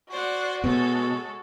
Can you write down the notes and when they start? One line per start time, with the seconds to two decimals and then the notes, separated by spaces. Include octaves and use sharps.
0.10 F#4 C5 D5 F#5
0.64 B2 G#3 A4 C#5